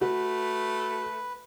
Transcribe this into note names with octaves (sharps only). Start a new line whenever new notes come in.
A3 F#4 B4